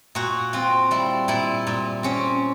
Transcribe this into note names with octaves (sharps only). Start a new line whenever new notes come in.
A#2 F#4
C4 F4
G3 E4
A#2 E4
A#2
C4 C#4